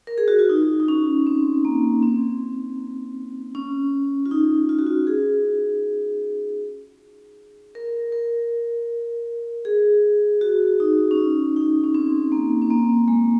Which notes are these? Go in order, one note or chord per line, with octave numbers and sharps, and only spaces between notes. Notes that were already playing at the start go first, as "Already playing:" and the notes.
A#4
G#4
F#4
F4
D#4
D#4
C#4
C4
A#3
C4
C#4
F4
D#4
F4
F#4
F4
G#4
A#4
A#4
G#4
F#4
D#4
C#4
D#4
D#4
C#4
C4
A#3
C4
A#3
G#3